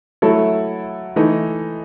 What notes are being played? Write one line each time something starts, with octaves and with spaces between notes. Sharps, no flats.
F#3 A3 E4 A4
E3 A3 D#4